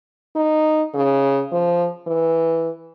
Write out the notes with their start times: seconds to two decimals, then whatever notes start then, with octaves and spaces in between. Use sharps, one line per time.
0.35 D#4
0.94 C#3
1.52 F3
2.07 E3